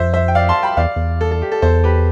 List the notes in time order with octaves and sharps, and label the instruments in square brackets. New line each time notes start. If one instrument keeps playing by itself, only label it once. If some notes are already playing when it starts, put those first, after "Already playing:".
Already playing: [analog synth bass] F2 [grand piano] C5 E5
[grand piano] C5 E5
G5
D5 F5
A5 C6
G5 B5
[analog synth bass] E2 [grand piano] D5 F5
[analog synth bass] E2
[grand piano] A4
A4
G4
A4
[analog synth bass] E2 [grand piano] A4 C5
[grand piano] G4 B4